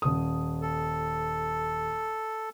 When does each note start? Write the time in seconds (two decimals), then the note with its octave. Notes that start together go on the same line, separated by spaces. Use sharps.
0.02 D#1 D#6
0.61 A4